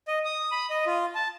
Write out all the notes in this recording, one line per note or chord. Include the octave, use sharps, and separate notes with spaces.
D#5
D#6
B5
D#5
F4
A5